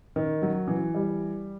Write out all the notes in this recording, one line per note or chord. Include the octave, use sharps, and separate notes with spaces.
D#3
F#3
E3
G3